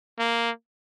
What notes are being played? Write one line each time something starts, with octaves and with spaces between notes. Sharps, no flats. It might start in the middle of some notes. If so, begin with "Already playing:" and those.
A#3